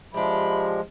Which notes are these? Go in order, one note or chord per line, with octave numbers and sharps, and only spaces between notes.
F3 G#3 D4 G4 E5 B5